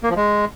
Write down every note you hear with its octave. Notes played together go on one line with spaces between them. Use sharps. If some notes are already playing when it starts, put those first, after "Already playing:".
A#3
F3
G#3